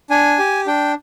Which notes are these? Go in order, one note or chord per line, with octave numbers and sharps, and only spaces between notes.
D4 G#5
G4
D4 G5